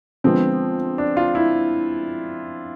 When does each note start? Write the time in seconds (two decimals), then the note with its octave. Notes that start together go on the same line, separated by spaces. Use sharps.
0.24 D3 F3 G#3 B3 C4
0.98 D4
1.17 F4
1.35 E4